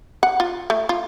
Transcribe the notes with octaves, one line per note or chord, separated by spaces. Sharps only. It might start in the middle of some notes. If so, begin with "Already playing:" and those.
F#5
F4
A3
F4